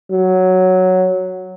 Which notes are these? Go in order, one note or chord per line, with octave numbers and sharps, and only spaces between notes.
F#3